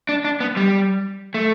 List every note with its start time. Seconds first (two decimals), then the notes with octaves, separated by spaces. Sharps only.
0.09 D4
0.25 D4
0.40 B3
0.57 G3
1.34 A3